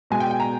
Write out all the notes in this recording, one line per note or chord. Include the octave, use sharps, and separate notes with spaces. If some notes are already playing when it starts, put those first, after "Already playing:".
B2 G#3 G#5
G5
G5
A#5